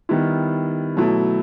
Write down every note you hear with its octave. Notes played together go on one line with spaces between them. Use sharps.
D#3 G3 B3 E4
B2 F#3 A3 E4